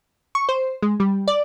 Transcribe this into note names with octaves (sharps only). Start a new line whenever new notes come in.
C#6
C5
G#3
G3
D5